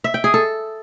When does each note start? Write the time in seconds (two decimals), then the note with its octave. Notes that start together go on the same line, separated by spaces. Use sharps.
0.04 E5
0.14 G5
0.24 G#4
0.34 A4